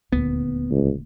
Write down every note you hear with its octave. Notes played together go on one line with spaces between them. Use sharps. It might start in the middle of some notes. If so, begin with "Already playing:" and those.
D#1 D2 B3
C#2